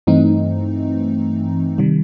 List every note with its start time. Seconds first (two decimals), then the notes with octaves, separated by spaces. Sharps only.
0.07 G2 E3 A3 C4 D#4
1.78 C3 D#3 G3